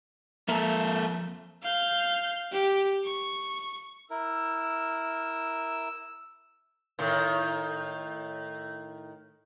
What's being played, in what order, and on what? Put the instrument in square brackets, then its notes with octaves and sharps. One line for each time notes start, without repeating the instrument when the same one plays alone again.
[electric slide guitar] F2 E5 A#5 [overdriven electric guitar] A#3 A4
[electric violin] F5 G6
G4
C#6
[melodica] E4 A#4 [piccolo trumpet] E6
[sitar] A2 D#3